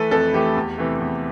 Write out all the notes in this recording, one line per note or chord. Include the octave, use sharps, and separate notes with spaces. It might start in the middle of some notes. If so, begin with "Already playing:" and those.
Already playing: E3 A3 A4 B4
F2 A4
E3 A3 G4
E2
C3 E3 A3
E2